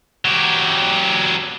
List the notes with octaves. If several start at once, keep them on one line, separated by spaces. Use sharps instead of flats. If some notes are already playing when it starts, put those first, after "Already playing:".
F#3 G4